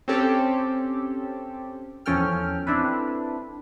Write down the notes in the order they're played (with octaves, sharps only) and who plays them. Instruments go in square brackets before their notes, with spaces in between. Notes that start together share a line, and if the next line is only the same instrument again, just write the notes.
[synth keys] C4 C#4 G4 A4
E2 F3 C#4 A4 G5 F6
C4 D4 E4 A4 B4